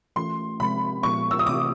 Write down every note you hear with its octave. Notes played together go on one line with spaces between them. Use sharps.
E3 A3 C#4 F4 C6
C3 F3 G#3 C4 B5
A#2 F3 G#3 B3 C#6
E6
D#6
C3 E3 A3 C4 F4 D6